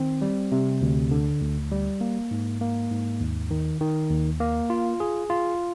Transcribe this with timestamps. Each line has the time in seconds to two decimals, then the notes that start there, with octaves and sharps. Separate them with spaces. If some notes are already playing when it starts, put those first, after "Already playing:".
Already playing: D#3 C4
0.22 G3
0.52 C3
0.82 D2
1.11 D3
1.41 D2
1.71 G3
2.01 A#3
2.31 G#2
2.61 A#3
2.91 G#2
3.20 D#2
3.51 D#3
3.80 D#3
4.10 D#2
4.40 A#3
4.70 F4
5.00 G#4
5.30 F4